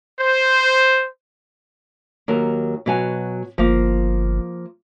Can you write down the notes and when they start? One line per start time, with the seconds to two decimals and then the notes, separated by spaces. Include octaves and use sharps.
0.18 C5
2.28 D#2 F#3 A#4
2.86 B2 F#3 G#5
3.58 G1 F3 A#3